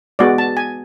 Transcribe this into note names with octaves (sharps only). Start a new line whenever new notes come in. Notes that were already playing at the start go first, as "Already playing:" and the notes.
G#3 B3 F#4 D5
A5
G#5